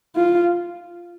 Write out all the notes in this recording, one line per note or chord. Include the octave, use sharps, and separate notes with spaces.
F4